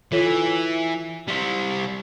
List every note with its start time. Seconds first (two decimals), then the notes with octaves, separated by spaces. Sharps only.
0.12 E3 F4 A4 C#5
1.28 G3 C5